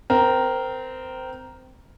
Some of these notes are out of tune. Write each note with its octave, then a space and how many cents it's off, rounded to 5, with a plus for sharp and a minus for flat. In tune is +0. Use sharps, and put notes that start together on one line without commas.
C4 -20 A#4 +0